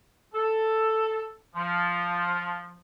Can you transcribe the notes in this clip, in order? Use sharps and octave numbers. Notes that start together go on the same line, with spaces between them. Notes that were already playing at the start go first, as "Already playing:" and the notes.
A4
F3